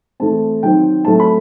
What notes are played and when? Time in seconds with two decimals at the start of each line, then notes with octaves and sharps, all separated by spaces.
0.20 E3 A3 C4 A5
0.63 D#3 F#3 C4 G5
1.05 A2 F#3 A3 C4 A5
1.20 B5